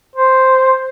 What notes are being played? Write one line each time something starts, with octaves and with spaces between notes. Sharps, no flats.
C5